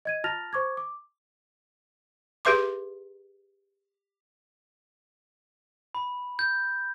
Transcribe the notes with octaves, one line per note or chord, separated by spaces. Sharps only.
D#5 G#6 D#7
F4 A5 F6 A6 A#6 F7
C5 C#6 D6 G#6
D6
G4 G#4 B4 E5 C6 D6
B5
G6